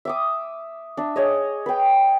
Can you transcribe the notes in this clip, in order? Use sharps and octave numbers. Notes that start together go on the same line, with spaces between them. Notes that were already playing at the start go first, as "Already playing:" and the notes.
E5 D6 D#6
D4 E5
G#4 C#5 D#5
B4 G5